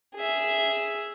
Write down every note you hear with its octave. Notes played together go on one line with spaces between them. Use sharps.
G#4 E5